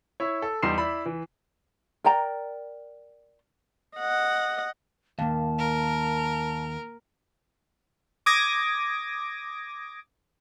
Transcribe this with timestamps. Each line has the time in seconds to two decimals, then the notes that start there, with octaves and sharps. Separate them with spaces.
0.20 E4 C#5
0.42 A4
0.62 E2 G3 D#4 C6 C7 E7
0.78 E4 D5 B5
1.06 E3
2.04 A#4 D5 G5 A#5
3.98 D#5 F#5
5.19 D#2 A#3 F5 A5
5.58 A#4
8.26 D6 D#6 G#6 A#6